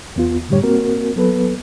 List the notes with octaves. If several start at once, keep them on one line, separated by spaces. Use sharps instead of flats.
E2 B3 F4
F#2 A2 D3 G3 G4 C#5
A#3 C4 F#4 A#4
F#3 B3 A4 B4